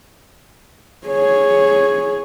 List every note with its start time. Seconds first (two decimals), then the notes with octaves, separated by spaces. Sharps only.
1.06 G#4 C#5